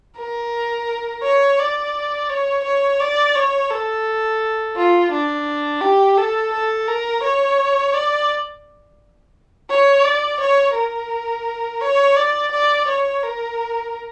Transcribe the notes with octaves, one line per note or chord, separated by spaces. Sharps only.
A#4
C#5
D5
C#5
C#5
D5
C#5
A4
F4
D4
G4
A4
A4
A#4
C#5
D5
C#5
D5
C#5
A#4
C#5
D5
D5
C#5
A#4